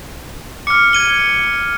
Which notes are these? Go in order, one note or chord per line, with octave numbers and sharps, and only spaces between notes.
D6 F6 C#7
G#6 D#7 G7